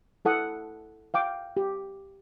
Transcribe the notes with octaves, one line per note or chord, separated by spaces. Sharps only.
E4 A4 F#5 D#6
F5 G5 D6
G4